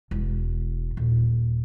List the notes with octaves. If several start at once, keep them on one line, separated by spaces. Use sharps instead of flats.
E1
D#1